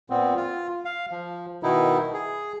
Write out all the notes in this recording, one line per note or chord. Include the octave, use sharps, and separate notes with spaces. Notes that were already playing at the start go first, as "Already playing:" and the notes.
A#2 B3 C4
F4
F5
F3
B2 D#3 D#4 E4
G#4